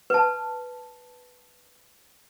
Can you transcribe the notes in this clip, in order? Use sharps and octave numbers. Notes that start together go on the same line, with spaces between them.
B4 A5